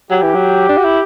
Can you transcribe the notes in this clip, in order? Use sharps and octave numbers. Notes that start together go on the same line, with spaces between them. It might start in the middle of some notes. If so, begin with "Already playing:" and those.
F#3 G4
E3
F#3
D4
F#4
E4